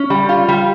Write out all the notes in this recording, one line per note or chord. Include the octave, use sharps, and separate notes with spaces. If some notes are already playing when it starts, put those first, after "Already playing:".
Already playing: C#4
G3
F4
G3